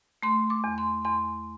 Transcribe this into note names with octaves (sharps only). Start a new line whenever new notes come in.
A3 C6
D6
E2
C6
E2 C6